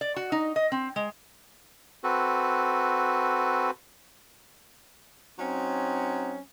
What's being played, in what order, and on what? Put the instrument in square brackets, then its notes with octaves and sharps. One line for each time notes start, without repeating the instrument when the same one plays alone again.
[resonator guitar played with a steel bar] D5
F#4
D#4
D#5
C4
G#3
[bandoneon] C4 F#4 A4 B4
[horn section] F#3 C4 C#4 D#4